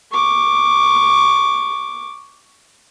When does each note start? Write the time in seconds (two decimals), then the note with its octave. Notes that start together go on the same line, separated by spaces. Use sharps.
0.12 C#6 D6